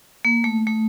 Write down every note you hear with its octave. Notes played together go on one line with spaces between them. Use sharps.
A#3
A3
A3